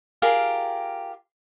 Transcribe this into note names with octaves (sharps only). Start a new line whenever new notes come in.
F4 G4 G#4 A#4